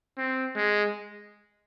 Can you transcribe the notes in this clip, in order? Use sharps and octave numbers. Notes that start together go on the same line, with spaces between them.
C4
G#3